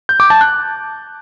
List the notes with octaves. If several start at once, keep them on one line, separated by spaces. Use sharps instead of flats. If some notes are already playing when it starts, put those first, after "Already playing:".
G6
D6
A5
F#6